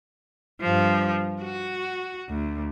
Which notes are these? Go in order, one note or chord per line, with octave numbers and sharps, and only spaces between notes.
G2 F3
F#4
D2